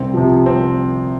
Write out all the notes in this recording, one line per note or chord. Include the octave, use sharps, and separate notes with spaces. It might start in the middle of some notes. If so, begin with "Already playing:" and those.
Already playing: C2 C4
C3 F3
C4